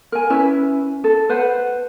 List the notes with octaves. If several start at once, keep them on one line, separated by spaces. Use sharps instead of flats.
A#4 G#5
C#4 E4 B4
A4
B4 C5 F#5